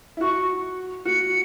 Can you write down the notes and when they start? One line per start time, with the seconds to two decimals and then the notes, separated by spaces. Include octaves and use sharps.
0.17 E4
0.21 F#4 C#6
1.05 F#4 C#7